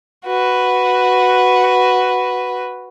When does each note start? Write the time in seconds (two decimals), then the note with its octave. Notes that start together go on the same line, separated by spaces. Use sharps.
0.26 F#4 B4